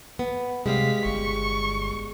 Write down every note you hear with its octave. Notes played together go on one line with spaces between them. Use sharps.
B3
C3 G3 G#3 F5 B6
G1 C#6